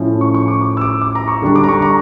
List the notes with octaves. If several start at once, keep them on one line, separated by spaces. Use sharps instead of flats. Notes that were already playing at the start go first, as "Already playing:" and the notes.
Already playing: A2 F3 C#4
C#6
C#6
D6
D6
E6
D6
D6
A#5
C#6
D3 G3 D4
D6
A#5
C#6
A#5